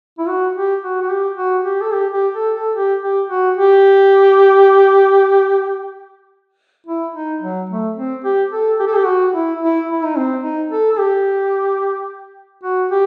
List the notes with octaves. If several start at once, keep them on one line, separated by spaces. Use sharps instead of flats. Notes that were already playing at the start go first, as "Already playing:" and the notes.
E4
F#4
G4
F#4
F#4
G4
F#4
G4
A4
G4
G4
A4
A4
G4
G4
F#4
G4
E4
D#4
F#3
A3
C4
G4
A4
G4
A4
G4
F#4
E4
E4
E4
D#4
C4
D#4
A4
A4
G4
F#4
G4